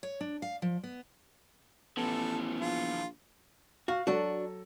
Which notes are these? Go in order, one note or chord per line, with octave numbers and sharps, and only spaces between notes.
C#5
D4
F5
F3
B3
A1 E3 F3 B3 A4
A#1 F4
F#4 F5
F#3 D4 F#4 A4